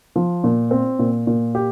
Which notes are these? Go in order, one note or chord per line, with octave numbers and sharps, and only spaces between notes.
F3
A#2
C4
A#2
A#2
G4